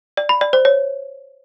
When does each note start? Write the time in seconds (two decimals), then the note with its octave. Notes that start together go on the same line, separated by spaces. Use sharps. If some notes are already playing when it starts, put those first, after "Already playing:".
0.17 D5
0.29 B5
0.41 D5
0.53 C5
0.65 C#5